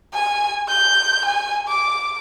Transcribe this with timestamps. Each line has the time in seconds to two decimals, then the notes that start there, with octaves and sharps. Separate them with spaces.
0.14 G#5
0.69 G6
1.25 G#5
1.69 D6